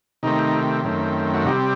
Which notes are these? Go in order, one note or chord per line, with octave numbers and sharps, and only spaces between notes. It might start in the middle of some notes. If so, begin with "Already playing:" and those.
C3 D#3 A3 C4 D#4
F#2 D#3 A3 C4
F#4
C3 G3 C4 D#4